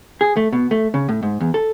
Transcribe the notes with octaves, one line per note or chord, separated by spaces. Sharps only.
G#4
A3
B2
A3
C#3
A2
G#2
E2
A4